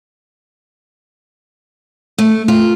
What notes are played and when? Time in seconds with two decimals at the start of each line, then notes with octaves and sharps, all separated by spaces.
2.18 A3
2.48 F4